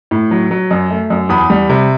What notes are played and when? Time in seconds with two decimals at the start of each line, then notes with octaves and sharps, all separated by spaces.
0.11 A2
0.31 F#3
0.51 F#3
0.71 F#2
0.90 A3
1.10 F#2
1.29 E2 B5 D#6
1.50 G3
1.70 C3